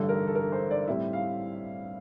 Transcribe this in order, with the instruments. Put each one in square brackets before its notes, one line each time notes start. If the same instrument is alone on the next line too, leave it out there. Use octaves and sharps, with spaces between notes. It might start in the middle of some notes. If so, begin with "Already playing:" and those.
Already playing: [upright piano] A1 G2 D3 G3 A4
A#4
A4
A#4
C5
D5
A2 G3 C4 E4 E5
F5